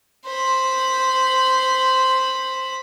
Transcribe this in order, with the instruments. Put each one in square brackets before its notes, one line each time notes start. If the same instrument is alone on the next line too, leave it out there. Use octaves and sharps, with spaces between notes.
[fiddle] C5 B5